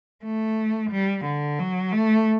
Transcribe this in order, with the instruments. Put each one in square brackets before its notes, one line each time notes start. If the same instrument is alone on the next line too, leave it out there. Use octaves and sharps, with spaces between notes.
[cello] A3
G3
D3
F#3
A3